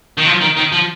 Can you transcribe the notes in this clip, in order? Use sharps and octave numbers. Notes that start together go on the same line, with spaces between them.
D#3
F3
D#3
D#3
F3